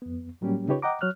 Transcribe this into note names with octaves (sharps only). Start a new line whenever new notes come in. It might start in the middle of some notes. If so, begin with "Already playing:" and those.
F2 B3
A2 F#3 G3 A#3 C#4 G4
C#3 D#4 F4 G4 B4 C#5
D#5 F#5 G5 A#5 D6
F#3 C#5 F6 F#6